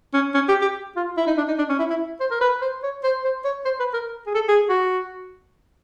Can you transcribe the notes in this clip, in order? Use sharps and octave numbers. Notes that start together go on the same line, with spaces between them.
C#4
C#4
G4
G4
F4
E4
D#4
D4
D#4
D4
C#4
E4
E4
C5
A#4
B4
C5
C#5
C5
C5
C#5
C5
B4
A#4
G#4
A4
G#4
F#4